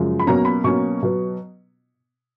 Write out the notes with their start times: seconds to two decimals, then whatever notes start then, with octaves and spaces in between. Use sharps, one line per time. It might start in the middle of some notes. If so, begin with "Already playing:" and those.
Already playing: F#2 C#3 F3 G#3
0.20 B5
0.27 B2 F#3 A#3 C#4 A#5
0.45 B5
0.64 B2 F#3 A#3 C#4 C#6
1.03 B2 F#3 B3